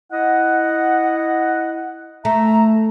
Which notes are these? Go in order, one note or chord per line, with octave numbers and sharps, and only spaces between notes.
E4 D#5 F#5
A3 E5 A#5